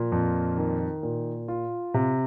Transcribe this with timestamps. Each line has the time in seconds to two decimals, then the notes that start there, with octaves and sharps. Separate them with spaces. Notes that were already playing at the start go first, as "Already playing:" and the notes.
Already playing: A#2 F3
0.12 F2
0.57 D#3
1.03 A#2
1.48 F4
1.94 C3